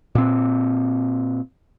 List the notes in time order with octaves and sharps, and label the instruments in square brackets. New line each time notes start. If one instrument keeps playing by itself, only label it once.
[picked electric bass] A#2 C4